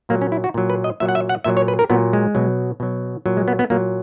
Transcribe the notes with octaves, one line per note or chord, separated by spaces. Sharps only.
A#2 F#3 A#3
C#4
E4
F#4
A#2 F#3
B4
D#5
A#2 F#3 E5
F#5
E5
F#5
A#2 F#3 E5
C#5
B4
A#4
A#2 F#3 B3
G#3
B2 F#3
B2 F#3
A#2 F#3
G#3
B3
B3
A#2 F#3 A#3